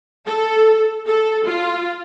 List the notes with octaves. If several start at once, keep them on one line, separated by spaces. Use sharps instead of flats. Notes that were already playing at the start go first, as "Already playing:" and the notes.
A4
A4
F4